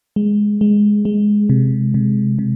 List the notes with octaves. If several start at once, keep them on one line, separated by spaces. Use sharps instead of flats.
G#3
G#3
G#3
C3
C3
C3